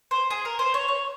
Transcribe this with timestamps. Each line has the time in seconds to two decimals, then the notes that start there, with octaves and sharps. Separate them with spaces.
0.11 C5
0.30 G#4
0.45 A#4
0.59 C5
0.74 C#5
0.88 C#5